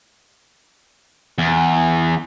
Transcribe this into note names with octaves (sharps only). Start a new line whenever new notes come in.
E2